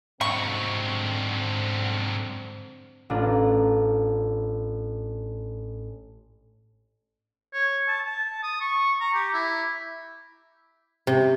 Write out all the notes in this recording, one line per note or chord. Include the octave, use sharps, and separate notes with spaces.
G#2 D3 F#3 C4 C#6
A1 D4 F4 A#5
C#5
A5
A5
D#6
C#6
A#5
G4
E4
C3